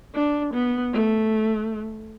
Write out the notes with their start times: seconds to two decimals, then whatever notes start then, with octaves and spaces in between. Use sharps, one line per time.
0.15 D4
0.54 B3
0.93 A3